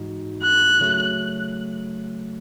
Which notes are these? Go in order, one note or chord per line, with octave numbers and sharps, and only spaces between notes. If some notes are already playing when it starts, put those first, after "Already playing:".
Already playing: G#2 E3 G#3 D#4 F#4
F#6
C#3 F#3 A3